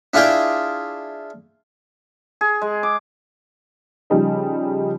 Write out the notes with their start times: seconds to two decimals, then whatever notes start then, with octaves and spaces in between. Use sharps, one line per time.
0.14 D4 E4 F4 G#4 G5 D6
2.41 G#4
2.62 G#3
2.83 D6
4.10 C#3 F3 G3 D#4